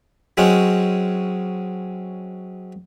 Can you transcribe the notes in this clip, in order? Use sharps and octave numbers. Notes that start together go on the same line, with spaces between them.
F#3 G#3 C4 C#4